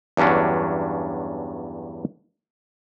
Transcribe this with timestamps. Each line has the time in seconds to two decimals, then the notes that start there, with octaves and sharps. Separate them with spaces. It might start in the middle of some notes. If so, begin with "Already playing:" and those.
0.17 E2 G2 F#3 C#4 D4